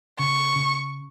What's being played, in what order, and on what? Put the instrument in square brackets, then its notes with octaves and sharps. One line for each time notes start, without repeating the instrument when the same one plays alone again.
[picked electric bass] C#3 [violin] C#6
[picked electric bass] C#3